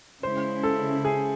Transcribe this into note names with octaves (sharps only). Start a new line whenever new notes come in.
C#3 G#3 C#4 E4 C5
A4
G#4